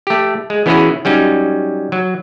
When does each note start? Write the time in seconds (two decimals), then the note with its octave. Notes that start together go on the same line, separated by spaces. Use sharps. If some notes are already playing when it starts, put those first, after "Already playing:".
0.07 A3 G4
0.50 G#3
0.66 E3 B3 C#4 E4 F#4 G#4
1.05 F#3 G3 C#4 D#4
1.92 F#3